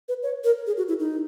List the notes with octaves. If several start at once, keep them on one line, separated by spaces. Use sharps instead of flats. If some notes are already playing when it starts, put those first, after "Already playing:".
B4
C#5
A#4
G#4
F#4
E4
D#4